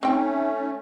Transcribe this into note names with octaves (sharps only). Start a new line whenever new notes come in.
A3 C4 C#4 D#4 G5